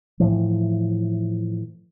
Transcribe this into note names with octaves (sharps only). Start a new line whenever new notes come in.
A2 E3 F3